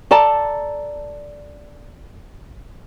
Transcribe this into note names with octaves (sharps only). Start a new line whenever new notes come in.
A4 D5 A5 A#5